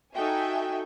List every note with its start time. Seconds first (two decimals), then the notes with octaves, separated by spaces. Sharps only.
0.14 D#4 F#4 A4 E5 G5 G#5